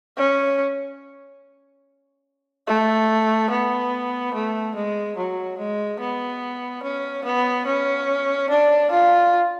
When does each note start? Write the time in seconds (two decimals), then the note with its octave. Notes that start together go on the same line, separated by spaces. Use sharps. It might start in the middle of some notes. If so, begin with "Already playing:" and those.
0.17 C#4
2.67 A3
3.50 B3
4.34 A3
4.76 G#3
5.17 F#3
5.58 G#3
6.00 B3
6.83 C#4
7.24 B3
7.66 C#4
8.50 D4
8.91 F4